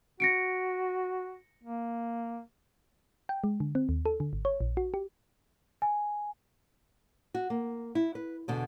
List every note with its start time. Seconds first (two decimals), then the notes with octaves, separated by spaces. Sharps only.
0.20 F#4 A#6 C#7 D7
1.63 A#3
3.29 G5
3.44 G#3
3.60 D3
3.75 C4
3.89 D#2
4.06 A4
4.20 D3
4.33 G#1
4.45 C#5
4.61 A#1
4.77 F#4
4.94 G4
5.82 G#5
7.34 F#4
7.50 A#3
7.95 E4
8.15 B4
8.48 E2 B2 D3